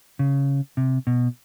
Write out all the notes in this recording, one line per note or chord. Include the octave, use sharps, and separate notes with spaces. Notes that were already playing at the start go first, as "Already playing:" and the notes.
C#3
C3
B2